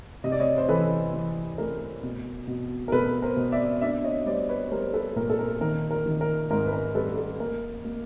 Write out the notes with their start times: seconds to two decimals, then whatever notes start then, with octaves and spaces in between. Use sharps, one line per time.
0.24 C3 D#5
0.32 D5
0.40 C#5 D#5
0.58 C5
0.69 E3 A4 B4
1.14 E3
1.58 A3 A#4
2.03 B2
2.47 B2
2.88 A#4
2.92 B2 A4 B4
3.22 A#4 C5
3.37 B2
3.52 D5 E5
3.81 D4 D5 E5
4.04 C#5 D#5
4.26 G3 C5 D5
4.49 B4 C#5
4.71 G3 A#4 C5
4.94 A4 B4
5.16 A#2 A#4
5.30 A4
5.39 A#4
5.61 D#3 A#4
5.91 A#4
6.06 D#3
6.21 A#4
6.50 G#2 A#4
6.66 B4
6.73 A#4
6.95 G3 A4 B4
7.17 A4
7.40 A#3 A#4
7.85 A#3